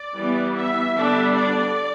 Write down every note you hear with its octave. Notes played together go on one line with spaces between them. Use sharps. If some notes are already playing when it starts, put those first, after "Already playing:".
Already playing: D5
E3 G3 B3
E5
D3 G3 B3 D4
D5